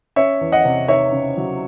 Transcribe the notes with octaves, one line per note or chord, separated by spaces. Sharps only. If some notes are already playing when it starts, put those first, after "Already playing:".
C#4 C#5 E5
E2
D#5 F#5
C3
D#4 C#5 E5
C#3
F#3